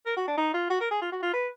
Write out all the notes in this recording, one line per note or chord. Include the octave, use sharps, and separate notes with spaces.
A#4
F#4
D4
D#4
F4
F#4
A#4
G#4
F4
F#4
F4
B4